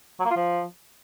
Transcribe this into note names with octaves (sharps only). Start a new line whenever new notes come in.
F#3
A#3
F4
F3